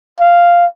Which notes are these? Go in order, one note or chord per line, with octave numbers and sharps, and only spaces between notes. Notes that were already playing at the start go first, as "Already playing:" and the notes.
F5